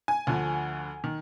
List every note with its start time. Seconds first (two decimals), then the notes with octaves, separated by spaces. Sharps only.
0.08 G#5
0.27 D2 D3 F3
1.04 D#3